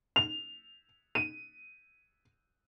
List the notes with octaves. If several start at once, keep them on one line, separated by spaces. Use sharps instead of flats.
F7
D#7